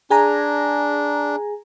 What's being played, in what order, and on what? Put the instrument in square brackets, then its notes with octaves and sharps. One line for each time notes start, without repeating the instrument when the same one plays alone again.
[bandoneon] D4 [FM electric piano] G#4 G#5 A#5